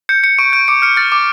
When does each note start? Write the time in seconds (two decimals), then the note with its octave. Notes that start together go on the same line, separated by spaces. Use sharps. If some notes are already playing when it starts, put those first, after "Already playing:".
0.09 G6 C#7
0.23 G6 C#7
0.38 C#6 D7
0.53 G6 D7
0.68 D6 C#7
0.82 F6 C#7
0.97 F6 A6
1.12 D6